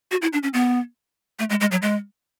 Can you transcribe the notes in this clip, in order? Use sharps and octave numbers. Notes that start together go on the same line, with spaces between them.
F#4
E4
D4
C#4
B3
A3
G#3
G#3
F#3
G#3